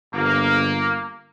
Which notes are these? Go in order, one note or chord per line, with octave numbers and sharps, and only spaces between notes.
G1 A#3